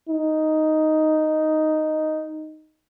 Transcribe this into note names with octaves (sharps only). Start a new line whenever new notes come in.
D#4